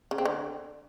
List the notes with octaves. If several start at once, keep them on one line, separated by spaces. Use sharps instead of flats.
C#3
C4
D3